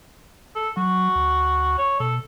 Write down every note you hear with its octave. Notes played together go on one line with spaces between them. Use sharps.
A4
F#3 F#4
D2
C#5
B2 A4